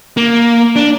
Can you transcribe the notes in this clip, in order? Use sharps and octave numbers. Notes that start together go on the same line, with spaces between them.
A#3
D4